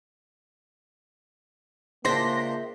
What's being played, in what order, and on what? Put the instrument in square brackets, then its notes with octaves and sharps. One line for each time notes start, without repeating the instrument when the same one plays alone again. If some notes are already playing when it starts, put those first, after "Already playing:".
[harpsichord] C#2 D4 [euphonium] A#3 [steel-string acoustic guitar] C5 E5 G5 [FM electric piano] C6 A#6